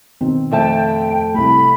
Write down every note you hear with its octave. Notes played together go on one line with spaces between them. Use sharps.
B2 D#3 C4
F2 A3 G5 A5
C2 A3 B5